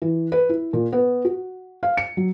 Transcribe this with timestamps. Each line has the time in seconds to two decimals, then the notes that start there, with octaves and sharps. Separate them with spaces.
0.02 E3
0.32 B4
0.49 E4
0.73 A#2
0.92 B3
1.25 F#4
1.83 F5
1.97 C#7
2.17 F#3